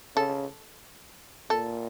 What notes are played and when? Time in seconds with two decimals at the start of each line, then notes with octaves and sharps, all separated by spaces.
0.16 C#3 A4
1.50 A#2 A4